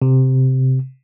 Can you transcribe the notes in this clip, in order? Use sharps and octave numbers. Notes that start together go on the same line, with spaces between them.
C3